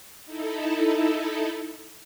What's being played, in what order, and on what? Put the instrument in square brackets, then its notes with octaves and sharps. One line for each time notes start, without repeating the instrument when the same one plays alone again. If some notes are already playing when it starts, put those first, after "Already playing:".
[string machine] D#4 E4 A4